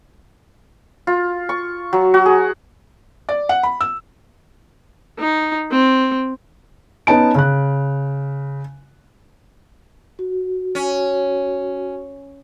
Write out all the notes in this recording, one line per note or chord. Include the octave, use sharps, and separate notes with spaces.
F4
C#6
F#3
F#4
G#4
D5
F#5
B5
E6
D#4
C4
B3 C#4 D#4 A5 D7
C#3 F#6
F#4
C#4